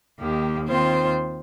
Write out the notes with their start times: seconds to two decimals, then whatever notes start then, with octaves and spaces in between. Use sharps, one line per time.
0.18 D#2 D#3 A#3 G4
0.68 D#2 D#3 C4 F4 C5